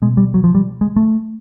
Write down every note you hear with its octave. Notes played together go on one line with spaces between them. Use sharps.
B2 G#3
G3
F#3
F3
G3
G#3
A3